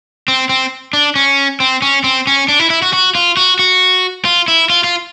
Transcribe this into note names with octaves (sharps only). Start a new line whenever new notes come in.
C4
C4
D4
C#4
C4
C#4
C4
C#4
D4
E4
E4
F#4
F#4
F4
F#4
F#4
F4
E4
F4
F4